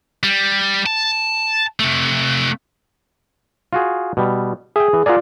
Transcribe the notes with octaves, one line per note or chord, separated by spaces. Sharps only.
G3
A5
C3 A3
F4 F#4 G#4
B2 G3
G#4 E5 G5
E3
F4 G#4 A#4 D5 F#5